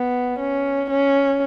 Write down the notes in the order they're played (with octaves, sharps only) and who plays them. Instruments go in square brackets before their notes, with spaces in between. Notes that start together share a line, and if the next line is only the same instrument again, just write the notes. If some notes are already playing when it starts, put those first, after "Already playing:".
Already playing: [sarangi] B3
C#4
C#4